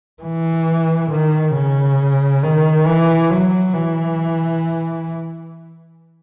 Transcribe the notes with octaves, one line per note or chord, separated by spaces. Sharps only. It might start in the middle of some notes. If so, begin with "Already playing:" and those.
E3
D#3
C#3
D#3
E3
F#3
E3